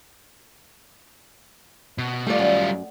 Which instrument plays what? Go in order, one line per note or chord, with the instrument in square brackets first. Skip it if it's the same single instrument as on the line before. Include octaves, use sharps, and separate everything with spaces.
[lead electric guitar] B2
[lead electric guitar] G3 F4 [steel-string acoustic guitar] A3 D5
[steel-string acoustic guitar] F#2